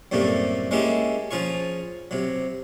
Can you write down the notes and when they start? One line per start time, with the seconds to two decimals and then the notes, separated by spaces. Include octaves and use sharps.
0.12 F#2 A2 C3 G3 A3 A#3
0.71 G#3 A#3 C#4 E4 G4 A4
1.31 F3 C#4 F4 G#4 C#6
2.11 C3 F#3